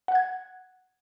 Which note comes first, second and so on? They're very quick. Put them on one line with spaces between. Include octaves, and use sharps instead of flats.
F#5 F#6 G#6